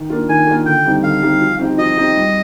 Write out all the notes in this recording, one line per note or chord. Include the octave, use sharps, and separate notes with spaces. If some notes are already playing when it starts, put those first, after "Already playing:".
Already playing: D#3
A#3 D4 F4
D#3 G#5
A#3 D4 F4
D3 G5
G3 C4 D#4 G4
D3 F5
G3 C4 D#4 G4
F3
C4 D#4 G4
F3 D#5
C4 D#4 G4
G3